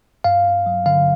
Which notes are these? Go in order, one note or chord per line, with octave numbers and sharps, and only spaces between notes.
G2 F5
G2
F#3
D3 F5